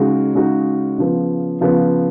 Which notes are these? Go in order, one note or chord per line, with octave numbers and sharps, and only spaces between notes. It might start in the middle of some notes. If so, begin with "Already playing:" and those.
Already playing: C#3 G#3 D#4 F#4
C#3 G#3 D#4 F#4
C#3 F3 B3
C#3 F3 B3